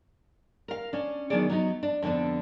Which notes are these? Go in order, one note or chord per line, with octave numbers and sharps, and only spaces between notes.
A#4 F5
C#4 D4
D#3 F#3 B3 D4 G#4 D5
F#3 B3 D#4
D4
F2 D3 A3 B3 D4